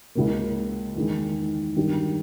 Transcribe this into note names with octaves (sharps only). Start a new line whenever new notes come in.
C#2 C#3 E3 A#3
E2 D#3 G#3
G2 D#3 G3